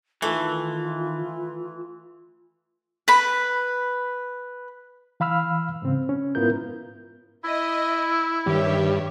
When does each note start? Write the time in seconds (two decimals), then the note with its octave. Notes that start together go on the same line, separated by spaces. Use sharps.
0.22 D#3 E3 A3 F4
3.08 B4 B5
5.20 E3 F5 B5 E6 F6
5.82 G#2 C#3 C4
6.09 C#4
6.35 G#2 B3 E4 F4 A#4 G6
7.45 E4 D#5 E5
8.46 G2 D#3 G4 C#5 E5